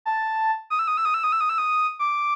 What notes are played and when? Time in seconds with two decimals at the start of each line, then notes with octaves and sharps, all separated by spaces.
0.06 A5
0.70 D#6
0.79 E6
0.88 D#6
0.97 E6
1.05 D#6
1.14 E6
1.23 D#6
1.32 E6
1.41 D#6
1.49 E6
1.58 D#6
1.99 D6